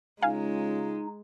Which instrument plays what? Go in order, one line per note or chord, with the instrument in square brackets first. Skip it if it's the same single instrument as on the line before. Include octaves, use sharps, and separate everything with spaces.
[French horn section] C#3 C#4 F4 [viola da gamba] G#3 [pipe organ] D#4 [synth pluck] F5 G#5